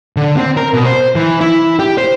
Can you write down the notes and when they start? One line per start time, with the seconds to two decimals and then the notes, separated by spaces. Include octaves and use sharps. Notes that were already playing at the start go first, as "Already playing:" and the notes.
0.17 D3
0.36 C4
0.57 A#4
0.74 B2
0.86 C5
1.15 E3
1.40 E4
1.79 G4
1.98 C5